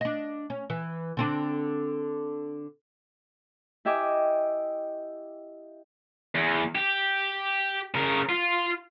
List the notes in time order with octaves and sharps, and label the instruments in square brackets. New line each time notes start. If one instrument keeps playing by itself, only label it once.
[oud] D4 D#5
C#4
E3
D3 C4 D4
[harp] E4 G4 D#5 E5 G#5 D6
[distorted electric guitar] E2
G4
C#3 A#4
F4